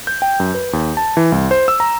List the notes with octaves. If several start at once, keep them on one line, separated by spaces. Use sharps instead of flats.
G6
G5
F#2
B4
D#2
A5
E3
C2
C5
E6
A#5